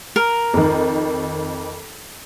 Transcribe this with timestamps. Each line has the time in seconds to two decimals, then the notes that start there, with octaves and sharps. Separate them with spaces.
0.16 A#4
0.54 F2 D#3